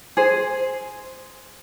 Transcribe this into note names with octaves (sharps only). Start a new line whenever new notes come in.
G#4 C5